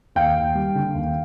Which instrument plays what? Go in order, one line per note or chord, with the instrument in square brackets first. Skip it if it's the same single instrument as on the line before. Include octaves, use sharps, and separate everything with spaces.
[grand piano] D#2 F5 G5
D#2
G3
D3
D#2